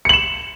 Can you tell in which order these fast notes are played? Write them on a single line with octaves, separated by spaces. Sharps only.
C#7 F#7 E7